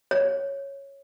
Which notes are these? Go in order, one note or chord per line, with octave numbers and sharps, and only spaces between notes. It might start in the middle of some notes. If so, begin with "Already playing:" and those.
C#5